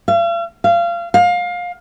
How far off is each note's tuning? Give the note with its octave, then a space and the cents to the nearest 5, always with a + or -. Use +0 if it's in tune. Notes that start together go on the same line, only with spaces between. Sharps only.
F5 -45
F5 -25
F5 +25